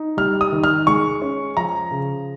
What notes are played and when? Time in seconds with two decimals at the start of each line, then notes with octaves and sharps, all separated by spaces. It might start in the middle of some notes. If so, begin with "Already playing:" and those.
Already playing: D#4
0.17 G3 F6
0.41 D#6
0.52 D#3
0.64 F6
0.87 G#3 C#6
1.22 C#4
1.57 F3 A#5
1.91 C#3